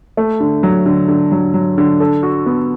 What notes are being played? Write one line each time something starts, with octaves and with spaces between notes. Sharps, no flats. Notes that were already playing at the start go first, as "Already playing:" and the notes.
A3
D3
F#3
D3
D3
F#3
F#3
D3
A4
F#4
B3